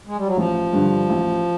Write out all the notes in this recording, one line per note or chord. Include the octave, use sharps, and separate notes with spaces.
G#3
G3
F#3
A1 F3
G2 D3
A1